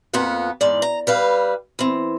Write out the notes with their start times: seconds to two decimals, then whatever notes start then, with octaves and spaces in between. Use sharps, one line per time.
0.13 F2 F3 A#3 B3 F#5
0.61 E2 G#2 D5
0.82 A#5
1.07 G3 B4 F5
1.79 E3 C4